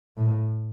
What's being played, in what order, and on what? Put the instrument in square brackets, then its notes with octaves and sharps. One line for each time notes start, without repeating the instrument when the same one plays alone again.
[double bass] A2